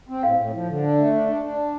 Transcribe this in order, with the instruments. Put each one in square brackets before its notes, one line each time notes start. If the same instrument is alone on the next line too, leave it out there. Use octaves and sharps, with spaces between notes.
[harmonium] C4
[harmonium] A2 [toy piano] F5
[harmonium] A2
F3
D3
D4
A3
D4
D4
D4